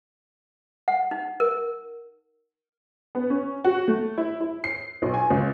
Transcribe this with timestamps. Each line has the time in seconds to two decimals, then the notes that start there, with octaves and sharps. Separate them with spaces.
0.88 F#5
1.11 D#4
1.40 A#4
3.15 B3
3.30 C#4
3.64 F#4
3.88 A3
4.18 E4
4.40 E4
4.64 C7
5.02 B1
5.14 G#5
5.30 C#2